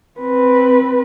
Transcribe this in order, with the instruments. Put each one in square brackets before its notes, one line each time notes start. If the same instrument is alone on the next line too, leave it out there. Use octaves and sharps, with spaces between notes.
[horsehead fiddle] C4 B4